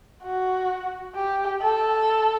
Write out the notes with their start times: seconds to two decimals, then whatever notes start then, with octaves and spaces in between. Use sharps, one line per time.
0.23 F#4
1.15 G4
1.62 A4